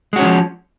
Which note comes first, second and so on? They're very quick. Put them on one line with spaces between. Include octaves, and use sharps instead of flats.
G#3 F#4 C#4 D#3 F3